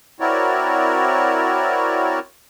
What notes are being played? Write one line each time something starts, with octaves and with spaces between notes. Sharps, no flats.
C4 E4 F#4 A#4 C#5 D5